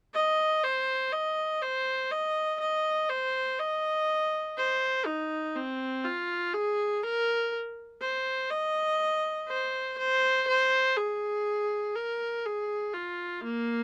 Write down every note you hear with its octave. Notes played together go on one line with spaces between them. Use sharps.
D#5
C5
D#5
C5
D#5
D#5
C5
D#5
C5
D#4
C4
F4
G#4
A#4
C5
D#5
C5
C5
C5
G#4
A#4
G#4
F4
A#3